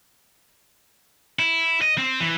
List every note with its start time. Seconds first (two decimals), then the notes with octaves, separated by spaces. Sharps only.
1.39 E4
1.82 D#5
1.98 C4
2.20 E3